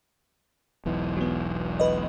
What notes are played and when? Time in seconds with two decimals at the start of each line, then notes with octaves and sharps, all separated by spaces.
0.85 E1 B1 E3
1.16 F#3 B3
1.80 B4 D#5